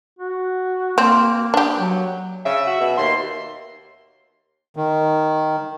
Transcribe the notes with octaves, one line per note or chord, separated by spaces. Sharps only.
F#4
A#3 C4
D4 G4
F#3
C#3 E5
F#4
B2
D#2 C6
D#3